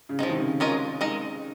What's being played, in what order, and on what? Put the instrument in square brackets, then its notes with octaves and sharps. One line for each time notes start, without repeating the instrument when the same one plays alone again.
[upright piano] C#3
[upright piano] C3 [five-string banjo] F3 G#3 D#4
[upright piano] D#3
C#3
[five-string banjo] G#3 C#4 F4 A#4 D#5
G#3 D#4 A#4 D#5